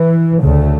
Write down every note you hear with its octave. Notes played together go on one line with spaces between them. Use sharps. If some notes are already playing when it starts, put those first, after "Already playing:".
Already playing: E3
D2 C#3 A3